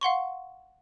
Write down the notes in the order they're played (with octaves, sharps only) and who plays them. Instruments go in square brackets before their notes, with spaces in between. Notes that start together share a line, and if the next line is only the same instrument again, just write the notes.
[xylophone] F5 F#5 C6 C#6